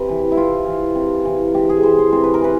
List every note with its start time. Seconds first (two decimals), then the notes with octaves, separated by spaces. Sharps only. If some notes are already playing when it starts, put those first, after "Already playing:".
Already playing: C3 B4
0.09 E3
0.32 E4
0.37 C3 F4
0.66 E3
0.95 C3
1.25 E3
1.54 C3 G4
1.69 G#4
1.83 E3 C5
1.98 C5
2.12 C3 C5
2.24 B4
2.34 A#4
2.42 E3 B4